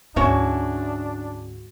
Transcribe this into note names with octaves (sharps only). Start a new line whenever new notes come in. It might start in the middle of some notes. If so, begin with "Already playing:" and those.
D2 G#2 C#4 D4 E4 F#4 C#5 E5